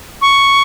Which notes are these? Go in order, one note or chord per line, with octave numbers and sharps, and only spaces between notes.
C#6